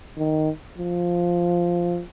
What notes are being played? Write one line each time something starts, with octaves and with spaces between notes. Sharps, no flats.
D#3
F3